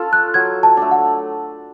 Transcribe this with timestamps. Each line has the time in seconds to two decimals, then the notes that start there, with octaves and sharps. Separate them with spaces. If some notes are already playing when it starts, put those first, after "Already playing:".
Already playing: C#4 F4 A4
0.13 F#6
0.34 F#3 G#6
0.63 A5
0.77 A3 D4
0.91 F#5